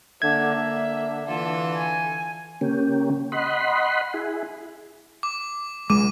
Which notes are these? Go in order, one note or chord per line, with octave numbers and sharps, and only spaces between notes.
D3 A#3 E5 G#6
D3
E3 F4 A4
G#5
C#3 A#3 C#4 G4
D#5 F#5 B5 C6
E4 G#4
D6
C2 G#3 D6 D#7